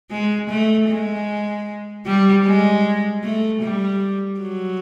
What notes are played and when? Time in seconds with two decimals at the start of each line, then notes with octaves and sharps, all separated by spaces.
0.11 G#3
0.50 A3
0.89 G#3
2.06 G3
2.45 G#3
3.23 A3
3.62 G3
4.40 F#3